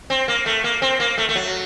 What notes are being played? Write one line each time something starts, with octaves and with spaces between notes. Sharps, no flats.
C4
A#3
A3
A#3
C4
A#3
A3
A3
F#3